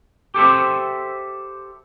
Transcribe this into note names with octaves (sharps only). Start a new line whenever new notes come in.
G4 A4 C5 E5